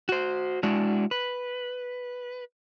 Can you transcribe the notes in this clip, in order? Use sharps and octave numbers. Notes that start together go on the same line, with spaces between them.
F#4 C5
G#3 D4 E4 F#4
B4